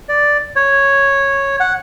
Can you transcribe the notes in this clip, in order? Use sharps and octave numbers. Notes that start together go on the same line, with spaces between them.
D5
C#5
F#5